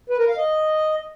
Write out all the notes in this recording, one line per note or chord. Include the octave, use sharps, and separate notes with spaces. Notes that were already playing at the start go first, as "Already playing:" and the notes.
B4
A#4
F5
D#5